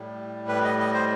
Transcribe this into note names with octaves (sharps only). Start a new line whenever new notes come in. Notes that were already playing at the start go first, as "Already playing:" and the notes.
Already playing: A2 G3
B4
D#5
D#5
C5